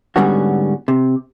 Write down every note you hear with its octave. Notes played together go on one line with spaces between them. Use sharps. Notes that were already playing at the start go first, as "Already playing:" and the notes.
G#2 D3 G3 B3 C#4 F#4
C3